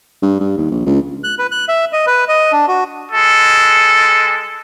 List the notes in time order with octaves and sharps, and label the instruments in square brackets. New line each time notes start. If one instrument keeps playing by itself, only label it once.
[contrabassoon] G2
G2
D#2
A#1
C#2
[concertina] F#6
B4
F#6
E5
D#5
B4
D#5
D4
F#4
[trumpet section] G#3 A4